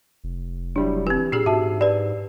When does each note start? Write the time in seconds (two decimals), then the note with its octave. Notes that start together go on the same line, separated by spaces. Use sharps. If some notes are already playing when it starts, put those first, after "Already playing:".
0.24 F1
0.76 F#3 G3 D4 E4
1.07 E3 C4 G4
1.32 A#2 D4 G4 G#4 E6 C7
1.46 G#2 F#4 E5 A5
1.81 G4 B4 D5